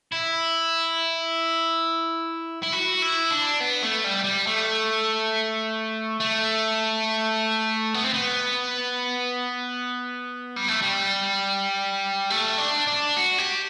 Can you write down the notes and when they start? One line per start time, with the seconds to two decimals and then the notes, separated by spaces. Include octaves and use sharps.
0.13 E4
2.63 E4
2.73 F#4
3.02 E4
3.31 D4
3.60 B3
3.82 A3
4.04 G3
4.25 G3
4.47 A3
6.20 A3
7.94 B3
8.04 C4
8.13 B3
10.56 G3
10.68 A3
10.82 G3
12.30 A3
12.58 D4
12.87 D4
13.17 F#4
13.38 G4